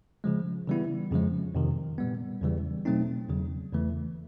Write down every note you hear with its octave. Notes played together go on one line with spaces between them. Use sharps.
C#3 F3 G#3
C#3 E3 G3 B3 E4
F2 C#3 F3 G#3
F2 C3 D#3
A#2 G3 B3
E2 C#3 E3 G3
B2 F#3 A3 C4 D#4
E2 C#3 F#3
E2 C#3 E3 A3